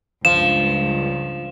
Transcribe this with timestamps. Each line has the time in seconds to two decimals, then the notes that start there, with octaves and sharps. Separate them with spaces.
0.25 C#2 G2 F3 E7